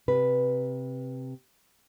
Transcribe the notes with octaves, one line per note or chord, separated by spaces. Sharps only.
C3 B4